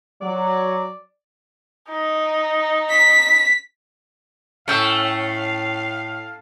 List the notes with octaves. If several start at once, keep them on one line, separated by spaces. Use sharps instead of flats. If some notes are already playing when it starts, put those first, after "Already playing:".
F#3 D5
D#4
B6
A2 A3 C#4 F5 G5 E6